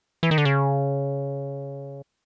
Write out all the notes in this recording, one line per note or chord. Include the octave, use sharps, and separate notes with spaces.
E3
D#3
D3
C#3